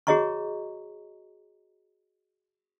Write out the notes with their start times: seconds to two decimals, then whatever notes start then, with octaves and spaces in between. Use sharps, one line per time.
0.07 F#4 G#4 C#5 D#5 A#5 C#6